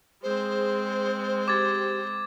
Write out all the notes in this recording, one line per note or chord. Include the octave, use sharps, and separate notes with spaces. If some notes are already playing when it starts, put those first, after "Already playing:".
G#3 C4 G#4 C5
G4 D6 G#6 A6